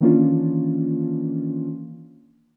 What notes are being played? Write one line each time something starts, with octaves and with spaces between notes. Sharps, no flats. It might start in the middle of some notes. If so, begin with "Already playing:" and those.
D#3 E3 A#3 C#4 D4 F4